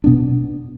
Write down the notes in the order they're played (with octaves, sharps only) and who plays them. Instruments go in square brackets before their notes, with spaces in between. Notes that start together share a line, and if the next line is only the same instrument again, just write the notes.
[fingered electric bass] B2 B3 D4